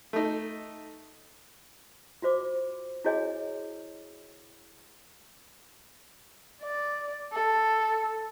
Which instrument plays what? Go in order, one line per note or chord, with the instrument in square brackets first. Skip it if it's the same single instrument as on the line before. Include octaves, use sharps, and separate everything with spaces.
[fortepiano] A3 D#4
[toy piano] F4 F#4 C5 D6
E4 F#4 G#4 C#5 D#5 G#5
[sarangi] D5
A4